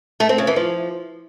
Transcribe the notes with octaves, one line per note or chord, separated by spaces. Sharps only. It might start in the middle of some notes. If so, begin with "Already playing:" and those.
A3
C4
C#3
E3
F3